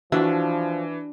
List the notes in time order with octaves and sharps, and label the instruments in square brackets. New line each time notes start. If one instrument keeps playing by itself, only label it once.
[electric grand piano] E3 [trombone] F3 [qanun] D4 [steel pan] F#4 E5